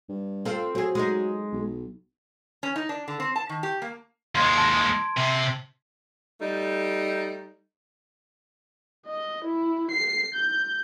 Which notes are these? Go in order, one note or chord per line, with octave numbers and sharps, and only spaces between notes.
G2
C4 F4 A4
F#3 C4 G#4
G#3 D#4
B1
C#4
D#4
D4
D3
C4
A5
D#3
G4
A#3
D#2 G#3 C6 G#6
A5 C6 D7
C3
G3 A3 D#4
D#5
E4
C7
G6